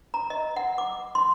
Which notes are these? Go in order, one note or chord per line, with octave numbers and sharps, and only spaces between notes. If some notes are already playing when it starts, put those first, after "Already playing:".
A#5
D#5
F#5
D6
C6